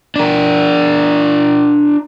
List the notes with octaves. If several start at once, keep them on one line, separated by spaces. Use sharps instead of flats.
D4 A#4